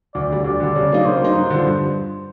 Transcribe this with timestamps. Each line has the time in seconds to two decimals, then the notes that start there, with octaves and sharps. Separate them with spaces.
0.14 D2 D5
0.30 D3 G3
0.45 D2 D5
0.60 D3 G3
0.76 C#3
0.91 F#3 A#3 D#4
1.05 C#3 C5
1.21 F#3 A#3 D#4
1.35 G2
1.50 D3
1.56 F3
1.66 G2